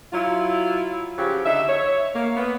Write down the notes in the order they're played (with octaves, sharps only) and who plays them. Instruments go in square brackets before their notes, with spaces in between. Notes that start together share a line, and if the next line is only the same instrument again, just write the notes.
[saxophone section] F#3 E4 F4
C#3 F3 F#3 G4
D3 D#4 E5
C#5
A#3
B3